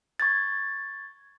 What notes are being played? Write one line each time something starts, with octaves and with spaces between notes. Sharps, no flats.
C#6 G#6 A6